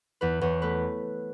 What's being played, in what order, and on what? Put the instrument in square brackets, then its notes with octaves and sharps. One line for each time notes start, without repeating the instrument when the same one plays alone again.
[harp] E2 B4
E2 C#5
A3 B4